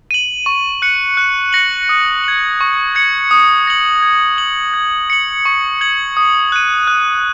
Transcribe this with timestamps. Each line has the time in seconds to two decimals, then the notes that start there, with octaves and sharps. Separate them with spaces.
0.11 D#7 F#7
0.46 C#6
0.82 F#6 C#7
1.17 F#6
1.53 A#6 C#7 F#7
1.89 D#6
2.24 G#6 F#7
2.61 C#6
2.95 G#6 C#7 F#7
3.31 D#6
3.67 A#6 F#7
4.02 G#6
4.38 F#7
4.74 G#6
5.10 C#7 F#7
5.45 C#6
5.81 G#6 F#7
6.17 D#6
6.52 F#6 D#7
6.87 F#6